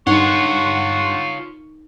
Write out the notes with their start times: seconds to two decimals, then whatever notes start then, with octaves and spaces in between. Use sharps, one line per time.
0.07 G2 D#4 F4 C#5 F#5 C6 C#6